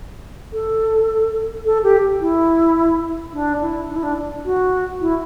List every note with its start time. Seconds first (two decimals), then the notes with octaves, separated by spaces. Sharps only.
0.53 A4
1.65 A4
1.83 G4
2.21 E4
3.33 D4
3.61 E4
3.90 D4
3.96 E4
4.03 D4
4.45 F#4
5.01 E4